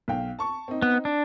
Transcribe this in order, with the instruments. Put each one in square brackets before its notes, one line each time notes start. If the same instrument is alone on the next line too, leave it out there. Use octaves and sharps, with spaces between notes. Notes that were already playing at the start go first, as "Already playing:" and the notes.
[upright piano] B1 F5 G5
A5 C#6
C4 D#4
[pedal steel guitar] B3
D4